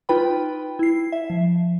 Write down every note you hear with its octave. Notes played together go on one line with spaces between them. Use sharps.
D#4 F4 B4 G5 B5
E4 C7
E5
F3